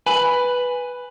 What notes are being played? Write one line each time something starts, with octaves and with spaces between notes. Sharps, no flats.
B4 G#5 B5